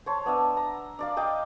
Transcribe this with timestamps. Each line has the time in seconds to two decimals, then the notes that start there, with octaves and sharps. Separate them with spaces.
0.06 C5 C#5 A5
0.26 B3 D4 E5
0.57 A#5
0.99 D4 D5 F5
1.17 D#5 F5 G5 D6